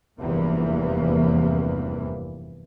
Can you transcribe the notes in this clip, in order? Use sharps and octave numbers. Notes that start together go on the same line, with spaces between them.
F1 E2 G2 C3 E3 A#3